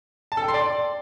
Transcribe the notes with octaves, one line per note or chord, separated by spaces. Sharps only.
A5
A4
G5
C6
D5